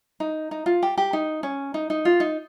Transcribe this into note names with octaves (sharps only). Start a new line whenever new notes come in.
D#4
D#4
F4
G4
G4
D#4
C#4
D#4
D#4
F4
D#4